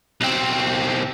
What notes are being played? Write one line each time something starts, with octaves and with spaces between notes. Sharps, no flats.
B1 C4